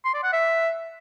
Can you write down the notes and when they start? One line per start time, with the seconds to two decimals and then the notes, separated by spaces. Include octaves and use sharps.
0.05 C6
0.14 D5
0.23 F#5
0.33 E5